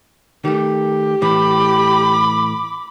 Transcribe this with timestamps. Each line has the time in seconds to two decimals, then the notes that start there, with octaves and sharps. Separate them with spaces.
0.45 D#3 A3 G4
1.22 A2 E3 B5 D6